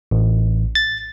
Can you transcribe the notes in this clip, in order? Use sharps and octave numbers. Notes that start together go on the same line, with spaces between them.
A1
A6